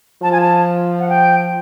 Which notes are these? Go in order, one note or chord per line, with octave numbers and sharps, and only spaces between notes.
F3 A5
G#5
A5
F#5
G5